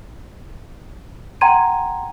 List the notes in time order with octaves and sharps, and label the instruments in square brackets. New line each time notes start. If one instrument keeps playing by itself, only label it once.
[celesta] F#5 G5 A#5 C6 G#6 D#7